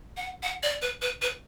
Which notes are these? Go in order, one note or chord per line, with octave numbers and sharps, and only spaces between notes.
F#5
F#5
D5
B4
B4
B4